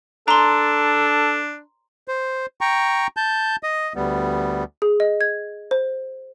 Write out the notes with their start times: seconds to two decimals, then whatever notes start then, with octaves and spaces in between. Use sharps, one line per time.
0.28 D4 A4 A#5 C6
2.08 C5
2.61 G5 A#5 C#6
3.17 A5 G6
3.63 D#5 D#6
3.95 D2 G3 B3
4.82 G#4
5.00 D#5
5.21 G#6
5.71 C5